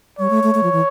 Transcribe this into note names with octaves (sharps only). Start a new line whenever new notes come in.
G3 C#5
A3
A3
A3
F3
E3